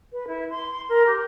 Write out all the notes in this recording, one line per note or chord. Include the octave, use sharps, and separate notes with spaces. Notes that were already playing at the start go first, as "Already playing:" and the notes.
B4
E4
C6
A#4
G4